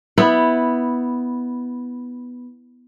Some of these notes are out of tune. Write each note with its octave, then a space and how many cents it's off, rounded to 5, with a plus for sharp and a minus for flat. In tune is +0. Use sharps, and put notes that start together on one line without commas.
B3 +0 E4 -10